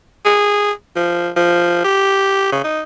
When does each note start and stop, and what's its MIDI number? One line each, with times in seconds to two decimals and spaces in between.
0.25 0.72 68
0.96 1.29 53
1.36 1.81 53
1.84 2.50 67
2.52 2.64 49
2.64 2.82 63